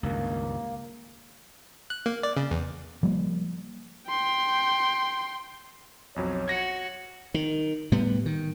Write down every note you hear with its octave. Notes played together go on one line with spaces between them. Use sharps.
C#2 G2 D#3 A#3
F#6
A#3
D5
C#3
E2
F3 G3 A#3
G5 C6
B1 F2 F#3 C#5
F#4 G#6 A#6 C#7
D#3
A2 G3 B3
D#3